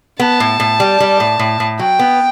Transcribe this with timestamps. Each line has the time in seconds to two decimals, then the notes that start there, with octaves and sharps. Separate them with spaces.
0.19 B3 A5
0.40 A2
0.60 A2
0.80 G3
1.00 G3
1.20 A2
1.39 A2
1.60 A2
1.79 F#3 G5
1.99 B3